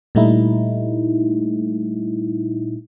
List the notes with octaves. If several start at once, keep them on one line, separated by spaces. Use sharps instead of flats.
A#2 G3 A3 D#4 E4